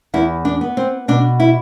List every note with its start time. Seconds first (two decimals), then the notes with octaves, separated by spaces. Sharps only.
0.14 E2 E4
0.45 D4
0.61 B3
0.77 C4
1.08 B2 D4
1.40 E4